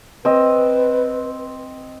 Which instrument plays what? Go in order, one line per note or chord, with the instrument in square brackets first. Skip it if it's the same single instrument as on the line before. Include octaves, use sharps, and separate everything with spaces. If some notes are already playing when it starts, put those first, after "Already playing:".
[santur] C4 D#5 [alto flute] B4